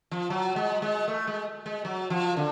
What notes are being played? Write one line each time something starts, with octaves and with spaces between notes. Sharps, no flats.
F3
F#3
G#3
G#3
A3
G#3
G#3
F#3
F3
D3